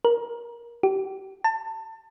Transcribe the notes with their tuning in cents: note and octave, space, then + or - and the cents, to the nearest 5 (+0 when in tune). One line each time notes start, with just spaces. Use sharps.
A#4 +20
G4 -30
A5 +25